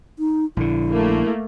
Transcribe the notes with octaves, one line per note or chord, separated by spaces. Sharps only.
D#4
A#1 D3 E4
A3 A#3